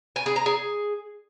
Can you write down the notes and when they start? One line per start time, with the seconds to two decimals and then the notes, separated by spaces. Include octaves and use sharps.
0.16 G#5
0.26 G#4
0.36 A#5
0.46 G#4